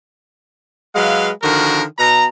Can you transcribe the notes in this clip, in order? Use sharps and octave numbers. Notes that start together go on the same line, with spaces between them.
F#3 G#3 B4 F5
D3 D#3 F3 F#4 A#4
B2 A#5